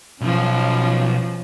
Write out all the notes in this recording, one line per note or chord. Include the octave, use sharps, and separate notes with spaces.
B1 F3 C#4